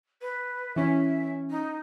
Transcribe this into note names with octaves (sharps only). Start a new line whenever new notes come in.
B4
E3 C#4 E5
D#4